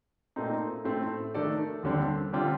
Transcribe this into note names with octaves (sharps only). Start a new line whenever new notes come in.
A#2 A3 C4 D#4
A2 A3 C4
D#3 A3 D4 A4 D5
D#2 D3 G3 C4
D3 G3 C4 F4